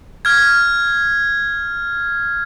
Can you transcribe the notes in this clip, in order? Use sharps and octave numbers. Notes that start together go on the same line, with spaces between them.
F6 G#6